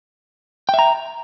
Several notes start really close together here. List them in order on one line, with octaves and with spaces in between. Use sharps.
G5 E5 A#5